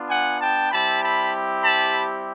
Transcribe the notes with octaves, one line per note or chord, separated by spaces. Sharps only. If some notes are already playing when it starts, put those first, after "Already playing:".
Already playing: B3 D4 F4
F#5 G#5
G5 A5
G3 C4 E4 G4 A5 B5
A5 B5
A5 B5